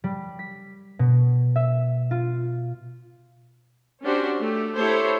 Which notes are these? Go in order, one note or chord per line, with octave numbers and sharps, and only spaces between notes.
G3
B6
B2
E5
F4
C#4 D4 F#4 G4 C5
A3 G4
E4 G4 A4 C5 C#5